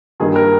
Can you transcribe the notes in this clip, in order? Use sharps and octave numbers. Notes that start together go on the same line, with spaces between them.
G2 D#3 G3 A#3 G#4
A#4